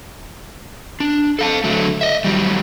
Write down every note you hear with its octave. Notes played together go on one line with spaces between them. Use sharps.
D4
A4 F5 A5
D3 F#3 A3
D#5 E5
D#3 F#3 G3